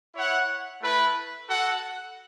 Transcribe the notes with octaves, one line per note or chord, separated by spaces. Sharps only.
E4 C#5 F#5
A3 E4 B4
F#4 A4 F#5